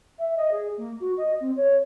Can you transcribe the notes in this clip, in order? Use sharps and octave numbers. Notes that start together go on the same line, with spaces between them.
E5
D#5
G#4
A#3
F#4
D#5
C4
C#5